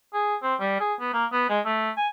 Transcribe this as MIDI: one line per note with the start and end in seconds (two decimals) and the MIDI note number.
0.14 0.36 68
0.43 0.55 60
0.60 0.79 55
0.80 0.94 68
1.01 1.12 59
1.14 1.25 58
1.33 1.48 59
1.50 1.60 56
1.65 1.91 57
1.97 2.08 80